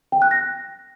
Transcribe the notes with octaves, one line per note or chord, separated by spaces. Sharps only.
G5
F#6
A#6